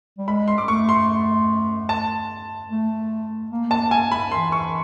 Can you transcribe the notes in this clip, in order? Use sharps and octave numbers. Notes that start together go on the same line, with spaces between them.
G3
G#3 B5
C6
D6
A3 C#6
C6
A5
A3
A#3
A5
G#5
B5
E3 C6
C#6